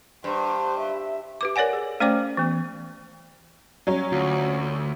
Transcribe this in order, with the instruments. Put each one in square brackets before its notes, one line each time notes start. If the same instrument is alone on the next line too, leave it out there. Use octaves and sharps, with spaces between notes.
[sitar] G2 [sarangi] C5
[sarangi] E5
[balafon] G4 B4 D6
A#4 C#5 D5 F#5 G#5
G#4
A3 C#4 C5 D5 G5 D6
E3 B3
[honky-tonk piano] F#3 C#4
[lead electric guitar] D2 [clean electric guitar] F4 F#4